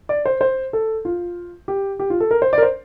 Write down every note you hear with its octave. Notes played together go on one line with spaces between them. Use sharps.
D5
C5
C5
A4
F4
G4
G4
F4
A4
A#4
C5
D5
A#4
C5